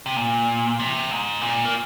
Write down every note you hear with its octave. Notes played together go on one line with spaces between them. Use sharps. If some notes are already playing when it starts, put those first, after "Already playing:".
C3
A#2
C3
G#2
A#2
A#3